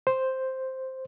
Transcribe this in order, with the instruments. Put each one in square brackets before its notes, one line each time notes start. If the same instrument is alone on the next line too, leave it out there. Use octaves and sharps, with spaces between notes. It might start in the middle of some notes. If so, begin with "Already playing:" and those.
[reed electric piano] C5